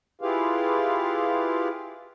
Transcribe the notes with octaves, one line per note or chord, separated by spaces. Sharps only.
E4 F4 G4 G#4 B4 F5